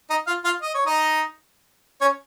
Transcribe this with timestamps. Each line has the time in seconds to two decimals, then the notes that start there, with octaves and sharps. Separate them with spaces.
0.10 D#4 D#5
0.27 F4 F5
0.45 F4 F5
0.62 D#5
0.74 C#5
0.86 D#4 D#5
2.01 C#4 C#5